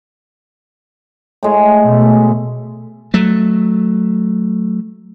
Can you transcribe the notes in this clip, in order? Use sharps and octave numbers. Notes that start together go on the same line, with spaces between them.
A2 G#3
B2 A3
F#3 A3